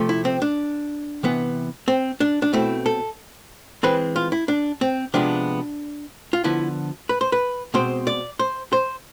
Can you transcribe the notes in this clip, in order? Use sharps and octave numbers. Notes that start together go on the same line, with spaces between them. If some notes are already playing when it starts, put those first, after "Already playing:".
Already playing: C3 F3 A3
E4
C4
D4
C3 E3 B3
C4
D4
D4
B2 A3 C4 E4
A4
E3 G#3 C4 B4
F4
E4
D4
C4
C3 F3 G#3 B3 D4
F4
D3 F3 B3 E4
B4
C5
B4
B2 G#3 C4 C5
D5
C5
C5